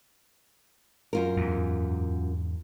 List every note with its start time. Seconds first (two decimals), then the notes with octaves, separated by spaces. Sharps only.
1.13 F#2 F4 A#4
1.37 E2 G#2